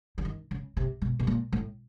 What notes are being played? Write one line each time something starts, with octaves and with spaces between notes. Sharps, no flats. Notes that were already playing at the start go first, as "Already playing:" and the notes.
D3
D#3
C#3
C3
B2
B2
A#2
A2